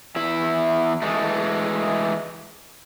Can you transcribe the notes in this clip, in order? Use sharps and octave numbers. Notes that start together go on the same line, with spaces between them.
E2 E4 E5
E3 G#3 A3